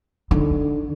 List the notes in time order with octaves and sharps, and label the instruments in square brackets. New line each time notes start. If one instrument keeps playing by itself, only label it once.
[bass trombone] D3 [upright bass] D#4